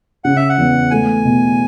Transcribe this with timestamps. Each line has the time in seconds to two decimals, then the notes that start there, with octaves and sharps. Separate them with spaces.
0.24 C#3 F#5
0.36 E5
0.49 F#5
0.58 E2
0.91 A3 G#5
1.25 B2